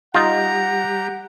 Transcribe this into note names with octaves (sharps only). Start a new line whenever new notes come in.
G3 D#4 F4 G4 F#5 A#5